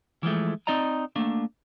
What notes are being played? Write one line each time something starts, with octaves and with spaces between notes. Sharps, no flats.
E3 F3 G#3 A3
C4 D#4 D5 D#5 A#5
A3 A#3 D4